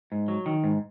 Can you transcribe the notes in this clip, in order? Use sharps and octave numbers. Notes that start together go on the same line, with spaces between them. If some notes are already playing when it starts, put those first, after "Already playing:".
G#2
F#3
D#3
G#2